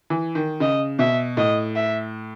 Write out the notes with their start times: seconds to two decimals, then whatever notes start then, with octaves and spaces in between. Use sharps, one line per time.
0.10 E3
0.35 D#3
0.60 C#3 D#5
0.99 B2 E5
1.37 A2 D#5
1.76 E5